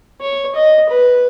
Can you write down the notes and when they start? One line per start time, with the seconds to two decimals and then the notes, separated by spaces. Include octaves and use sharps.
0.21 C#5
0.55 D#5
0.89 B4